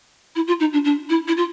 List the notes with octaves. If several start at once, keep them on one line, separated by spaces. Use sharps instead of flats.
E4
F4
D#4
D4
D4
E4
E4
F4